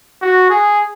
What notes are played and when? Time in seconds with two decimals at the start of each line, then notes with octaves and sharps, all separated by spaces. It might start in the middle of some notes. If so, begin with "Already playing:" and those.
0.22 F#4
0.50 G#4